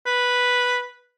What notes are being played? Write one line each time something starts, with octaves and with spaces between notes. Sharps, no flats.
B4